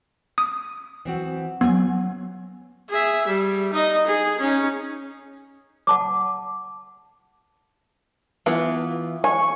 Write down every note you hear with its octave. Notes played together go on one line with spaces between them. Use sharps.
D#6
E3 C4 F#4
F#3 B3 G#5
G#4 E5
G3
D#4 D#5
G#4
C#4 D#4
F#5 A5 D6
E3 B3 F4
G#5 C#6